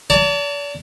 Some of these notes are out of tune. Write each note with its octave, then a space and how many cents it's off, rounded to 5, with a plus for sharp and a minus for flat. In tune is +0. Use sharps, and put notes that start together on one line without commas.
D5 -40 A5 +35